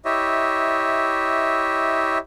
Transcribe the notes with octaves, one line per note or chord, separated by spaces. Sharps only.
E4 G4 C#5 D#5 E5